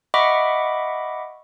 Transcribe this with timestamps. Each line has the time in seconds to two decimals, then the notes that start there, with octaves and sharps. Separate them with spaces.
0.14 D#5 E5 F#5 B5 C#6 D6